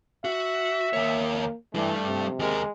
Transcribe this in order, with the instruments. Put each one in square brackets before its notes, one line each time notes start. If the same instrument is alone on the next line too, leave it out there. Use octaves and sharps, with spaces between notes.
[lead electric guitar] F#4 [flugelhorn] E5
[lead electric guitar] D#2 C#5 [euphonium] A#3
[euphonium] E3 [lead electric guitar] G3 D4 [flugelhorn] A3
[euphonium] C3
[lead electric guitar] D#2 A#4 [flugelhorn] G#3